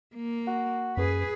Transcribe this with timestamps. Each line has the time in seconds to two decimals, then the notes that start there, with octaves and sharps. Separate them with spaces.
0.16 A#3
0.47 F#4
0.97 F#2 G#4 B4